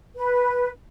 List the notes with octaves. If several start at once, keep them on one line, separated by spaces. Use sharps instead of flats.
B4